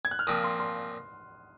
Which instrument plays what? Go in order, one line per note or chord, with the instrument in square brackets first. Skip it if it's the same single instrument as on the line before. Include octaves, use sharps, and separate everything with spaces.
[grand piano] G#6
F#6
F6
[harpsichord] A#2 F3 C4 [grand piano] D#6
[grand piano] C6
C6